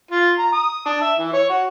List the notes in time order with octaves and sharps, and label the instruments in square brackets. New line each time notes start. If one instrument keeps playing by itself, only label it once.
[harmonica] F4
A#5
D#6
D4
E5
E3
C#5
F#4